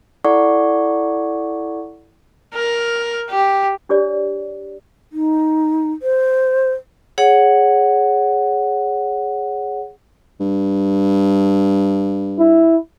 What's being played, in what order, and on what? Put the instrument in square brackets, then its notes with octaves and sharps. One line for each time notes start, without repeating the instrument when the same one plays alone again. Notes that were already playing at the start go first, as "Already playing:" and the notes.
[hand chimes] E4 A4 D5 F#5 C#6
[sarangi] A#4
G4
[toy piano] D4 G4 C#5 D5
[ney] D#4
C5
[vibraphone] G#4 C#5 F#5
[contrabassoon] G2
[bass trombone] E4